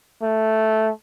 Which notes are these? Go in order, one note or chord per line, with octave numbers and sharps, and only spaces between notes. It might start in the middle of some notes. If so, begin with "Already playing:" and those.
A3